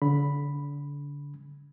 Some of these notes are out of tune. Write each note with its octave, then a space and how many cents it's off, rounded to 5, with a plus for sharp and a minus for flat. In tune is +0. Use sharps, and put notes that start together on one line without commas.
D3 -35 B5 +0